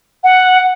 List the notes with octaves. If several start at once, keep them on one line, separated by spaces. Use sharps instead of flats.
F#5